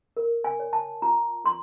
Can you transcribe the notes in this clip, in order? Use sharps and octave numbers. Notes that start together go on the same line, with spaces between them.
A#4
G#5
C#5
A5
F4 A#5
F4 C6